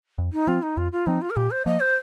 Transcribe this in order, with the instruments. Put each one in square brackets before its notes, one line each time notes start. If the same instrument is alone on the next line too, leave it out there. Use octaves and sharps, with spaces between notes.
[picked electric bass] F2
[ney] D#4
[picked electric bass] F3 C4 [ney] F4
[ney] D#4
[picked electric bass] F2 [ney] F4
[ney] F4
[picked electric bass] F3 C4 [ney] D#4
[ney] F4
A#4
[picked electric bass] A#2 [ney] G4
[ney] C5
[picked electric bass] F3 A#3 [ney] D#5
[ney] C5